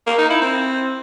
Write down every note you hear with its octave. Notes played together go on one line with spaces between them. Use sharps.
A#3
D#4
E4
C4